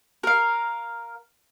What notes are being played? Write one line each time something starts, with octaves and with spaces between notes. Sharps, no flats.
A#4 F5